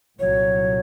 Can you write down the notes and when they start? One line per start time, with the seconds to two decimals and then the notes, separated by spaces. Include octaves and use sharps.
0.19 C2 A#2 F#3 C#5